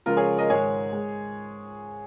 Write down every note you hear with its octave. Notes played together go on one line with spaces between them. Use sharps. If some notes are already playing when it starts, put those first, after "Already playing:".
C#2 C#3 F3 G#3 F4 A#4
G#4 C#5
A#4 D#5
G#2 D#3 G#3 G#4 C#5
G#3